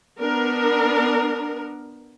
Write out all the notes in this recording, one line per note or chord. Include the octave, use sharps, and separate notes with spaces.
B3 D4 A#4